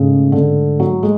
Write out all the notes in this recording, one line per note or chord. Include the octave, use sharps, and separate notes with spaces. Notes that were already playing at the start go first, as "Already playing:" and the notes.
Already playing: G#2 C#3 A3
D3
F#3
G#3